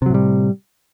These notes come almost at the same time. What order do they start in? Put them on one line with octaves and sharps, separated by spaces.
C3 F#3 A2 G3